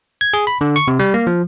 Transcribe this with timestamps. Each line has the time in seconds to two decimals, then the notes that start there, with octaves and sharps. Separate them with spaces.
0.21 G#6
0.34 G#4
0.47 B5
0.61 D3
0.76 C#6
0.88 C3
0.99 G3
1.14 A#3
1.27 F3